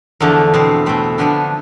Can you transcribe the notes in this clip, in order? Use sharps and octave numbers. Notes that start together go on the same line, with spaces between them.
E2 D3 F3 A3
B2 A3 C4
B2 A3 C4
D3 F3 B3 D4